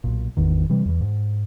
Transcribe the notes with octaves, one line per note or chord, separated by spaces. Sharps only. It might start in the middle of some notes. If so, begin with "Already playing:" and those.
B1 A#2
G#1 E2 D#3
C3 E3 G3
E2 E3
G#2